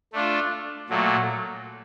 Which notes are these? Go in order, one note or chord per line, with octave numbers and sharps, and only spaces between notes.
A3 D4 F4
A#2 F#3 A3